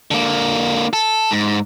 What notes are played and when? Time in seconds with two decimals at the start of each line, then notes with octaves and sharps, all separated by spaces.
0.11 D3 A#3
0.93 A4
1.31 G#2